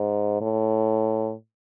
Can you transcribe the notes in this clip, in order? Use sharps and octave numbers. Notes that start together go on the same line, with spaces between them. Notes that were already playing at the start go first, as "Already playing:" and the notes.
Already playing: G#2
A2